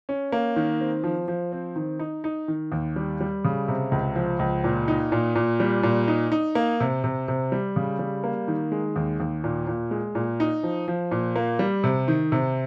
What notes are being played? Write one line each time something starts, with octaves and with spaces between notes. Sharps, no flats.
C#4
A#3
D#3
C4
F3
F3
C4
D#3
D#4
D#4
D#3
D#2
G3
G3
C#3
C3
C#2
F3
C#2
A#2
D#4
A#2
A#2
G3
A#2
D#4
D#4
A#3
C3
C3
C3
G3
C#3
G3
A#3
D#3
G#3
D#2
D#2
A#2
A#2
G#3
A#2
D#4
F3
F3
A#2
A#3
G3
C3
D#3
C3